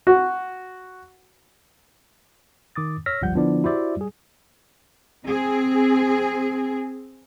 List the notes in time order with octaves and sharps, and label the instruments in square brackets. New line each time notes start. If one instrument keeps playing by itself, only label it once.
[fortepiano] F#4
[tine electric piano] D#3 D6 D#6 A6
C#5 E6 F6 A#6 B6
G1 C#2 F3 G3 F#5 G6
D3 F3 B3 D4 E4 D5
E4 F#4 G4 C5 D5 E5
G3 G#4
[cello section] C4 G#4